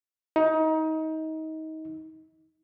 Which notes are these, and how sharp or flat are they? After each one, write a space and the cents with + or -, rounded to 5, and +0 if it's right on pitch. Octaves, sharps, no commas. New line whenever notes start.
D#4 +25